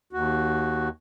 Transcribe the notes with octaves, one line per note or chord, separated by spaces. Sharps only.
D#2 F#4